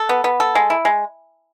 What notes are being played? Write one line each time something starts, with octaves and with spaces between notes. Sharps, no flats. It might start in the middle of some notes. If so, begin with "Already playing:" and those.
Already playing: A4
B3
B3
A4
G#3
E4
G#3